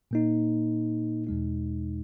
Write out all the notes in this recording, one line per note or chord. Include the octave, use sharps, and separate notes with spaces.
A#2 A#3 D#4
E2 B2 G#3 D#4